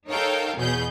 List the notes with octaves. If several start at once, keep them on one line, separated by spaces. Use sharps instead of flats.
D#4 A4 A#4 C#5 F5 G5
E2 B2 G#4 G6